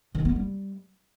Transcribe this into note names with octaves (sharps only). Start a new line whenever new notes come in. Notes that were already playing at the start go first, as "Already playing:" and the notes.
D#3
B3
G3